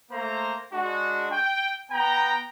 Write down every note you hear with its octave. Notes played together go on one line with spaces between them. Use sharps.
A3 A#3 C5 A#5
G#3 D4 F#4
G5
B3 G5 A#5